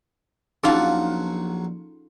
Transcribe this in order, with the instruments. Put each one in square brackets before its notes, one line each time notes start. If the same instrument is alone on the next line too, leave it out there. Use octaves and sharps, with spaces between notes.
[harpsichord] A#1 F#3 F#5 [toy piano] C#4 D#4 G#4 [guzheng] F4 A4